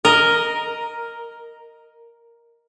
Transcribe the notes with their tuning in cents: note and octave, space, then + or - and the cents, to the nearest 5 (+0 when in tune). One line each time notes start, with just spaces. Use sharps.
A#4 +0 D#5 +0